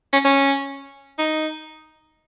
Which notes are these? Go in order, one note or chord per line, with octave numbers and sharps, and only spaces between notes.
C#4
C#4
D#4